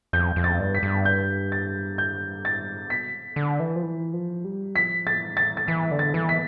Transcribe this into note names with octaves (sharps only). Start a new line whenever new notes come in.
F2 G6
F2
A6
G2
B6
G2
G6
A6
G6
A6
B2 B6
D3
E3
F3
E3
F3
G3
F3 B6
A6
E3
A6
A6
E3 B6
D3
A6
E3
B6